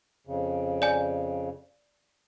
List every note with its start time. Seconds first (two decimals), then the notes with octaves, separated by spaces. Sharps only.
0.27 F2 C#3
0.82 D5 G#5